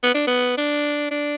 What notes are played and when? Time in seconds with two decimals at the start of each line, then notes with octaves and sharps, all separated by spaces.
0.03 B3
0.14 D4
0.27 B3
0.57 D4
1.11 D4